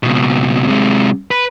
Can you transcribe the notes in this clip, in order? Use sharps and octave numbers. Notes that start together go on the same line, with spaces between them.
C#2 B2
C3 G#3
B4